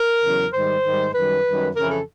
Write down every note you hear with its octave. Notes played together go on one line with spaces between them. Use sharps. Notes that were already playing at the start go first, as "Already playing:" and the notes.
Already playing: A#4
E2 C#3 F#3
G#2 D#3 G3 C5
G#2 D#3 G3
F#2 D#3 G3 B4
F#2 D#3 G3
F2 C#3 E3 A#4
A4